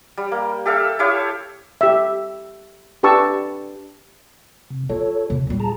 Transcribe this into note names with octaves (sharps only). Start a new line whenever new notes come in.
G3
A#3
G4 A4 E5 F5
E4 G4 C#5 F5
G4 E5
D4 G4 B4 A5 C#6 E6
C3
F4 A4 C#5
D#2 C3
A#2 G3
G#4 A5 A#5